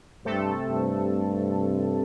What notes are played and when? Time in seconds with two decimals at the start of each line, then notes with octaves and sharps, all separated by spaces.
0.25 G2 C3 A3 C4 A4
0.67 G2